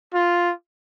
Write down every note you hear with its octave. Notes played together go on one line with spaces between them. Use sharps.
F4